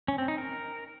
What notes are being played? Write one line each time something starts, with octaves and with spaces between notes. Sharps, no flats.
C#4
C4
D#4
A#4